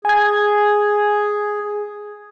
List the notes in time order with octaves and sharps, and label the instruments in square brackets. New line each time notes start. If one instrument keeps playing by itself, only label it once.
[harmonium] G#4 [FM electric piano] G#5 G#6